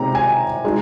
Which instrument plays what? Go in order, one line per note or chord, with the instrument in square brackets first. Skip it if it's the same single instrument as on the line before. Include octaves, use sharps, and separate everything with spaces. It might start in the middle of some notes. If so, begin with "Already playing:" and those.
Already playing: [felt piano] C3 G#3 C4 D#4 A#5
G#5
G#3 D#4